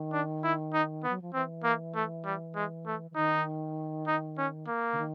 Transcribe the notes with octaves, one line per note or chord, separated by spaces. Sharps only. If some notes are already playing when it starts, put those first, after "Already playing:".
Already playing: D#3
D4
E4
D#4
B3
F#3
F3
E3 C4
A#3
A3
G3
G#3
A3
E3
D#3 D#4
D#4
C#4
A#3
D3
D#3